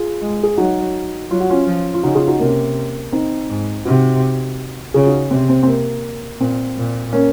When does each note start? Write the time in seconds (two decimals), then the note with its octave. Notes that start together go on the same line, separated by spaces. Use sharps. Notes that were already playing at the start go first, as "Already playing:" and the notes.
Already playing: F4 G#4
0.21 G#3
0.43 G#4
0.57 F#3 D#4 F#4
1.31 F#3 F4
1.40 F#4
1.50 C#4 F4
1.66 F3
1.94 F4
2.03 C#3 D#4 F#4
2.15 F4 G#4
2.27 D#4 F#4
2.40 C3 A#3 C#4
3.12 C4 D#4
3.49 G#2
3.85 C3 D#4 F#4
4.94 C#3 F4 G#4
5.07 D#4 F#4
5.31 C3 C4
5.49 C4
5.63 C4
5.68 A#3
6.40 A#2 C4
6.77 A#2
7.13 A#3 C#4